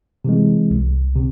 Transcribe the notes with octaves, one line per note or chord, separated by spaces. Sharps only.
C3 E3 G#3
C2
C3